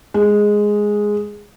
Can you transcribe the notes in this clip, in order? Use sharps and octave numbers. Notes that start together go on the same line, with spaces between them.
G#3